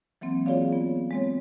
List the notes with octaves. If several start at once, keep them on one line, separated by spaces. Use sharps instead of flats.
E3 F#3 A#3 C4
F4 F#4 G#4 C#5 D5 F5
B3
G#3 C4 C#5